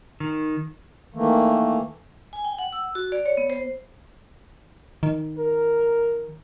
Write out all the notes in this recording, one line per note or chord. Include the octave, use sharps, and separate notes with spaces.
D#3
D#3 E3 A3 A#3
G#5
G5
F#5
E6
F#4
D5
C#5
B3
C5
D#3
A#4